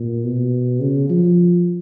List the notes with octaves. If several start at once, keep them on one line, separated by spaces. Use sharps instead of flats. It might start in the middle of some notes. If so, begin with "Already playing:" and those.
Already playing: A#2
B2
C#3
F3